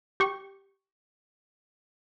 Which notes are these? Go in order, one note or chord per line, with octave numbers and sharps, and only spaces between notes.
G4 C#6